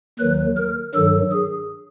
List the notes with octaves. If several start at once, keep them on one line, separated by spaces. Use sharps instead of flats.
D#2 D#3 F#3 B4
A#4
G2 D#3 F#3 A4
G#4